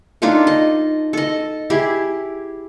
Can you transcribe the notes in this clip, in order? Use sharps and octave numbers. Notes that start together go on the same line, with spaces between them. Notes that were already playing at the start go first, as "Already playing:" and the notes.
D4 D#4 F4 A4
D#5
A4 D#5
E4 G4 G#4